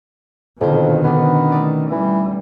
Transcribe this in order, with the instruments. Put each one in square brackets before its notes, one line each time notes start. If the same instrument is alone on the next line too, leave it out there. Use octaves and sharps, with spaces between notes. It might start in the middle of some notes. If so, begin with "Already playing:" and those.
[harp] D#1 D3 C5 [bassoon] F2 [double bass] B2 D#3
[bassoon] B3 [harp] C#4 D4
[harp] A3 D#4 D5
[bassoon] E3 [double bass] G3